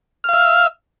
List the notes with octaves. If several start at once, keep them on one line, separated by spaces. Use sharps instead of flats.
E5 F5 F6